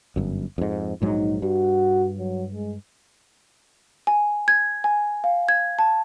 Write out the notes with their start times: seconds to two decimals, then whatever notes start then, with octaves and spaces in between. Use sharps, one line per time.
0.16 G1 F#2
0.58 F2 G#2
1.02 A#1 G#2 F#3 D#4
1.42 G2 F#4
2.18 F#3
2.53 G#3
4.07 G#5
4.48 G#6
4.84 G#5
5.24 F5
5.49 G#6
5.79 A5